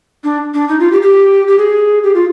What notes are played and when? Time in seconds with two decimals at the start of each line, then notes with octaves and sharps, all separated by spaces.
0.24 D4
0.54 D4
0.69 D#4
0.79 F4
0.92 G4
1.02 G4
1.47 G4
1.58 G#4
2.03 G4
2.15 F4